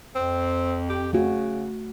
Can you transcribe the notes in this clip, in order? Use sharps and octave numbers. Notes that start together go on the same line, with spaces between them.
F2 C4
G4
C#3 A3 F#4